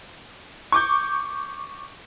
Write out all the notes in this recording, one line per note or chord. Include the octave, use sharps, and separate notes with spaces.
C#6 D6 G6